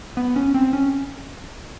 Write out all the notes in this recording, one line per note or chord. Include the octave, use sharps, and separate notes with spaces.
B3
C#4
C4
C#4